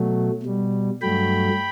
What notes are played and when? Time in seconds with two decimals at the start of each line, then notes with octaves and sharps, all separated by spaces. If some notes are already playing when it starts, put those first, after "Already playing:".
Already playing: B2 F#3 A3
0.43 B2 G3
1.02 G2 F#3 A3 G5 B5